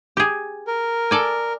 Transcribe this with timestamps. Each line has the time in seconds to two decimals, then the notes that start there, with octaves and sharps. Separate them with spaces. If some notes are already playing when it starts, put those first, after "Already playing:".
0.17 G4 G#4
0.67 A#4
1.11 A4 D5 G#5